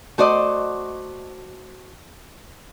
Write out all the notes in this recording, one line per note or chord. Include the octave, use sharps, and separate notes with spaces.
A3 F#4 C5 D5 D#5